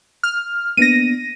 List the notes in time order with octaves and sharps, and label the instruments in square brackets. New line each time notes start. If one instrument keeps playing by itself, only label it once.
[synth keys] F6
[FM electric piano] A#3 B3 D4 [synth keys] A#6 D#7